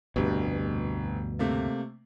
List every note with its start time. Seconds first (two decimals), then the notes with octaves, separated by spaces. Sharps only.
0.16 F1 D2 G2 B2
1.39 C3 A3 A#3